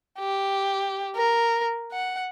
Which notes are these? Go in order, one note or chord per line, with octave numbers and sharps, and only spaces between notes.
G4
A#4
F#5